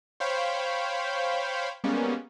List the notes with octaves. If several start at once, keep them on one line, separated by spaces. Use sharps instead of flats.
C5 C#5 F5 G5 B5
G3 G#3 A#3 B3 C#4